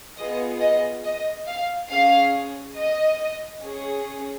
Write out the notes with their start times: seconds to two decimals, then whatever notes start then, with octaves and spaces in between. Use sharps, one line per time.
0.17 B3 F4 G#4 D#5
0.60 D#5
1.03 D#5
1.47 F5
1.89 C#4 G#4 F5
2.76 D#5
3.62 C#4 G#4